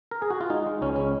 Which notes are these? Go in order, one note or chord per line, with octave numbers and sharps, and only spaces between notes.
A#4
G#4
F#4
F4
G#3 D#4
G#3
C#2 C#4
G#3 C#4